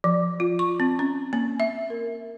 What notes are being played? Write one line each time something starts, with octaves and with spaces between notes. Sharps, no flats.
F3
F4
C#6
C4
C#4
A#3
E5
A#4